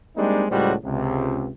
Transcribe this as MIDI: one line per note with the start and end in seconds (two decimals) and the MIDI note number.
0.17 0.45 55
0.17 0.45 56
0.17 0.45 58
0.17 0.45 60
0.17 0.45 62
0.17 0.45 63
0.50 0.74 37
0.50 0.74 45
0.50 0.74 55
0.50 0.74 56
0.50 0.74 66
0.50 0.74 72
0.85 1.49 37
0.85 1.49 48